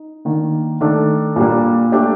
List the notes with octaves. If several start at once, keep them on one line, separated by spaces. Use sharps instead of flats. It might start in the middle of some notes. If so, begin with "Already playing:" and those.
Already playing: D#4
D#3 A#3 D4
D#3 A3 D4 A4
A#2 G3 A#3 D4
A3 D4 G4 D5